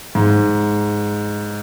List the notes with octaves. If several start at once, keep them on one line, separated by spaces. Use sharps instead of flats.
G#2